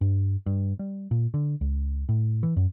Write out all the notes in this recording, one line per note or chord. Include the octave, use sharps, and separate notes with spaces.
G2
G2
G3
A#2
D3
C#2
A2
E3
F#2